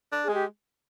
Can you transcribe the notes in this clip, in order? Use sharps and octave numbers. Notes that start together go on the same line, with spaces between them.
D4
G#3 G#4
G4